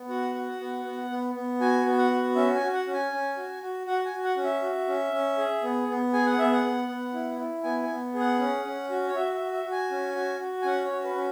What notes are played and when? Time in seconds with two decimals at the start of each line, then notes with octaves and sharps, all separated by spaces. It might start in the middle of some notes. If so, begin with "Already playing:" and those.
Already playing: B3
0.09 F#4 F#5
0.35 F#4
0.60 B3
0.85 B3
1.10 B3
1.35 B3
1.61 F#4 G#5
1.85 B3
1.98 F#5
2.11 F#4
2.35 C#4 E5
2.55 G#5
2.61 F#4
2.74 F#5
2.86 C#4
2.93 G#5
3.12 C#4
3.37 F#4
3.62 F#4
3.87 F#4 F#5
4.05 G#5
4.12 F#4
4.24 F#5
4.36 C#4
4.44 E5
4.62 F#4
4.88 C#4
5.12 C#4
5.37 G#4
5.62 B3
5.88 B3
6.13 G#4 G#5
6.26 F#5
6.39 B3 E5
6.52 F#5
6.64 B3
6.88 B3
7.13 E4
7.39 E4
7.63 B3 G#5
7.83 G#5
7.89 B3
8.14 G#4
8.20 F#5
8.39 C#4
8.65 C#4
8.90 F#4
9.07 C#5
9.15 F#4 E5
9.34 E5
9.40 F#4
9.53 E5
9.65 F#4
9.72 G#5
9.91 C#4
10.15 F#4
10.40 F#4
10.62 G#5
10.65 C#4 F#5
10.85 C#5
10.91 F#4
11.04 B4
11.15 C#4